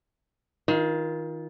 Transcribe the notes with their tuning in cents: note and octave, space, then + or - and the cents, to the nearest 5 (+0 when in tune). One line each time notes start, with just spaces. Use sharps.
D#3 +25 F4 +0